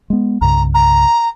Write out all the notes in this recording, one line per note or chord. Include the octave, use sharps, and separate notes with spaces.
G#3 B3
C2 G2 C#3 A#5
A#5